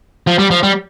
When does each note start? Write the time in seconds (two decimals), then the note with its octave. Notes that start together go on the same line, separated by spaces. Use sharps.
0.27 F3
0.39 G3
0.51 F3
0.63 G3